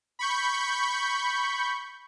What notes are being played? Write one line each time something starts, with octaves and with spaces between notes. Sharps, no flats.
B5 C#6 G6